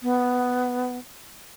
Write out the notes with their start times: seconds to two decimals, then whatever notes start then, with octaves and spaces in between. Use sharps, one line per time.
0.03 B3